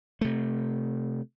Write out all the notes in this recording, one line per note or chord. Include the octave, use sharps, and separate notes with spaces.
C3 A3